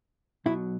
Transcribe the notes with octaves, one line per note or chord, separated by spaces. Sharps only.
B1 B2 F#3 E4